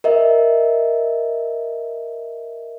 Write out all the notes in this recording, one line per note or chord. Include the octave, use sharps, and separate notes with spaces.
A#4 D#5 E5